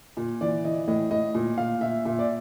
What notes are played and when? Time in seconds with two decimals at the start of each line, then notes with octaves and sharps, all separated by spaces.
0.17 A#2
0.41 E3 D5
0.65 E3 D#5
0.88 A2 D#5
1.11 A2 D#5
1.34 A#2
1.58 A#2 F5
1.81 A#2 E5
2.05 A#2 E5
2.19 D5